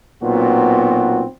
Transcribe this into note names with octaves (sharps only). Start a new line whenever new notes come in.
B1 A#2 B3 C4 F#4